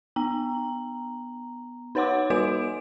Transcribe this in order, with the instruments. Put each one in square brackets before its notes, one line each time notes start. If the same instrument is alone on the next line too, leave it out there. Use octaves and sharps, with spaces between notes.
[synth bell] B3 A#5
D#4 B4 C#5 F#5 C6 D6
G3 F#4 B4 G#5 D7